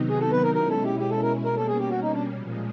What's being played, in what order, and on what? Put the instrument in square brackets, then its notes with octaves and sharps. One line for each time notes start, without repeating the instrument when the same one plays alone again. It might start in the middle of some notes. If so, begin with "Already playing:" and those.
Already playing: [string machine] C3 D#3 F#3 B3 D#4
[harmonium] G#4
A4
B4
A#4
[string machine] B2 G#3 C#4 E4 [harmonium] A#4
[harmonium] A4
G4
G4
A4
A#4
[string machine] B2 G3 A#3 C#4 [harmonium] A#4
[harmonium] A4
G#4
G4
F#4
D#4
D4
[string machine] A#2 F3 G#3